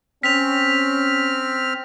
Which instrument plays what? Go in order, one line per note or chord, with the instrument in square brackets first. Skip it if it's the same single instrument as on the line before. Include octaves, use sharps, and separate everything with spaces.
[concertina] C4 F6 [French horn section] C#4 [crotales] B6 F7